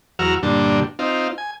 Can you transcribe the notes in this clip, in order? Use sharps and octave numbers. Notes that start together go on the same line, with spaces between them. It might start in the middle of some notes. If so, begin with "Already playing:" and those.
E2 F#3 F#4 A#5 E6 F6
G2 A#2 D3 G3 D4
C4 D#4 F4
G#5